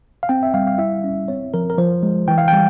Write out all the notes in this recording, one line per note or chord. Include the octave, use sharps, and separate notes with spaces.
F5
C4 G5
E5
G3 F5
F5
E4 E5
C#4
C4 C#5
F3 A#4
A#4
F3 C5
G#3
E3 G5
F5
G3 G5